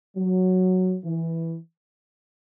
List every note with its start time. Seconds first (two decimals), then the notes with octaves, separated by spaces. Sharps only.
0.17 F#3
1.04 E3